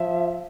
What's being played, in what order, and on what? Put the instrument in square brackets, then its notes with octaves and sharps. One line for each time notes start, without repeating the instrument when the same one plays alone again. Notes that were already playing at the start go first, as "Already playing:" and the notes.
Already playing: [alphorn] F3 [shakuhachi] E5